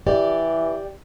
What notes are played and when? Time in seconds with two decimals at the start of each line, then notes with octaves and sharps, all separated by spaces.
0.07 E3 G4 D5